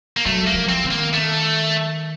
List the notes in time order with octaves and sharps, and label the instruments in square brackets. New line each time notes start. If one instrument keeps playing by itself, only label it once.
[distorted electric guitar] A#3
[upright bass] F#3 [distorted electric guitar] A3
[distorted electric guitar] A#3
[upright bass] F3
[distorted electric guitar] C4
[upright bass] D#3
[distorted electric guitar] A#3
A3